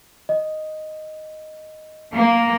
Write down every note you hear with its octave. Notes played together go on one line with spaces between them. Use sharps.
D#5
A#3